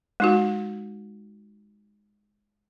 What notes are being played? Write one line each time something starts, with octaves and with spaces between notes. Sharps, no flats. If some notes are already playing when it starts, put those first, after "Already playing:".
G#3 D#4 F#4